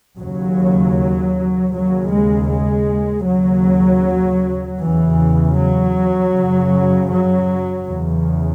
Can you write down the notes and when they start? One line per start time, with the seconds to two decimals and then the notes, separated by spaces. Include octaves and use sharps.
0.18 D#2 C#3 F#3
1.72 D#2 C#3 F#3
2.10 G#3
2.49 G#3
3.25 D#2 C#3 F#3
4.80 E2 C#3 E3
5.56 F#3
6.34 F#2 C#3
7.10 F#3
7.87 E2 C#3